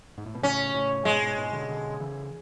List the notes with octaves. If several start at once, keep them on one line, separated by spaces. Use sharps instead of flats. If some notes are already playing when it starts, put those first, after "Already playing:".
G#2
A2
B2
A2 C#3 C#4
A2 C#3
G#2 B2 G#3
G#2 B2
G#2 B2
B2 D3
B2 D3
C#3 E3